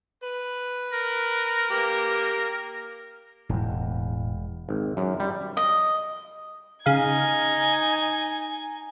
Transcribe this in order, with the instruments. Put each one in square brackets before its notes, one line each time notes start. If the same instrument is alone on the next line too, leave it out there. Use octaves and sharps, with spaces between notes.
[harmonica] B4
[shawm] A#4
[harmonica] A#3 G4
[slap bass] E1 E2 [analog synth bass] A2
[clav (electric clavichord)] G#1
F#2
G3
[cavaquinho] D#5
[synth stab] C#3 F5 [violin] D#4 G#6 [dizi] G#5